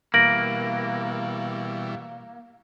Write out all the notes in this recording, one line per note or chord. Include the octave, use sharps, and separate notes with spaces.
B2 E3 G3 A#3 A#6 D7 F#7